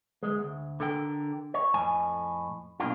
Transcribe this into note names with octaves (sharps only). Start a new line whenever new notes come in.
D2 G#3
D2
D3 A4 A#4 G5
C#5
F2 A2 G#5
B1 B2 A#3 D4 F4